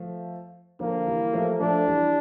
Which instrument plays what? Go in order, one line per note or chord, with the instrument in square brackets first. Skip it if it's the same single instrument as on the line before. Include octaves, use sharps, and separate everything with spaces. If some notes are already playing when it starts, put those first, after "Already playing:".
Already playing: [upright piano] F3 A3
[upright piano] D3 F3 [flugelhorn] A#3
[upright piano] E3 G3
F3 A3
[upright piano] F3 A3 [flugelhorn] D4
[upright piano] E3 G3